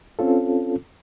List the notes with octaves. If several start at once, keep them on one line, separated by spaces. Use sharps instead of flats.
C4 C#4 F4 A4